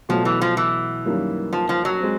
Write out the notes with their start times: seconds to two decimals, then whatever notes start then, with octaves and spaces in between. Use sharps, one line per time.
0.09 B2 F3 F#3 A3
0.25 E3
0.41 F3
0.57 E3
1.05 F#2 D#3 G3 A#3
1.53 F3
1.69 F3
1.85 F#3
2.00 G#3 C4